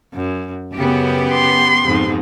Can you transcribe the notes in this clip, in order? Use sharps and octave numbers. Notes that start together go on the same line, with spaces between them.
F#2
F#2 C#3 B3 G4
C6
F2 G#2 D#4